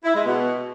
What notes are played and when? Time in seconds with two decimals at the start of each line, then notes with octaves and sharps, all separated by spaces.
0.04 E4
0.15 G#3
0.25 B2